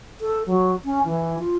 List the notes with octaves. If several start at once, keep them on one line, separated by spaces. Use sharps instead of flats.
A4
F#3
C#4
E3
F4